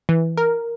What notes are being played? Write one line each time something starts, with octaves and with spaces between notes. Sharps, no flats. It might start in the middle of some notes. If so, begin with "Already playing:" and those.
E3
A#4